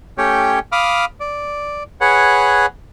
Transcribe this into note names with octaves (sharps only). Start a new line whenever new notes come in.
A3 C#4 G4 C#5 G5
F5 B5 D6 D#6 F6
D5
G#4 B4 C#5 F#5